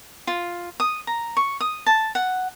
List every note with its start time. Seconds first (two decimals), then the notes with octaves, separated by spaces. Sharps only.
0.27 F4
0.80 D#6
1.07 A#5
1.37 C#6
1.61 D#6
1.86 A5
2.15 F#5